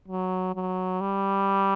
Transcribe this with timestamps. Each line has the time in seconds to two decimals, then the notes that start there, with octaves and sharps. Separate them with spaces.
0.08 F#3
0.55 F#3
1.01 G3